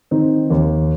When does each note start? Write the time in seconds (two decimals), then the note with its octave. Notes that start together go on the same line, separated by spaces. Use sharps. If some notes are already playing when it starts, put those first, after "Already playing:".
0.11 D#3 C4 D#4
0.50 D#2